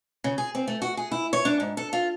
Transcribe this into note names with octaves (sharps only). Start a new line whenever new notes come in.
C#3
G#4
C4
A3
F#4
G#4
E4
C#5
D4
G#2
A4
F4